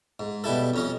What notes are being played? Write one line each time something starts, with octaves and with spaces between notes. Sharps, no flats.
G#2
B2 G3 E4 A4
F2 C#4 D#5